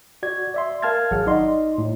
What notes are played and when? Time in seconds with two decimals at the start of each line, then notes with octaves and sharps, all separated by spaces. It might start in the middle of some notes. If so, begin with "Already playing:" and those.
0.23 F#4 D5 G#6
0.54 D5 E5 C6
0.82 A#4 F5 A5 F6 G#6 A6
1.11 G#1 F#3 G#4 F#5 F6
1.27 D#4 D5 D#5 C6
1.78 A2